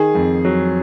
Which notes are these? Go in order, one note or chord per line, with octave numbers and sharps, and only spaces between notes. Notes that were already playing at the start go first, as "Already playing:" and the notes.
Already playing: D#3 G#4
F2
F#3